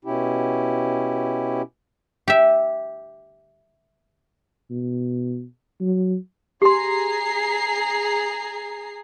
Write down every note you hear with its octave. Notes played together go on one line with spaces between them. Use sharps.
B2 C#4 E4 G4
G4 E5
B2
F#3
G4 G#4 A#5 C6 C7